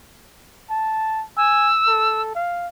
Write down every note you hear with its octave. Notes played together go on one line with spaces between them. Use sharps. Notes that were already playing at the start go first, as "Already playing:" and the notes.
A5
G#5 E6
A4
F5